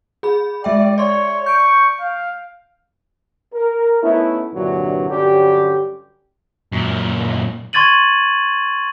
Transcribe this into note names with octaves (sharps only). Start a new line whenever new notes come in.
G#4 B5
G#3 D5 E5 G5
C#5 D5 C6
C#6 G6 D7
F5
A#4
A3 B3 C#4 D#4 E4
C2 G2 A#2 D3 E3 F#3
G2 D3 F#3 C#4 G4
F#2 A#2
C6 C#6 G#6 A6 D#7 F#7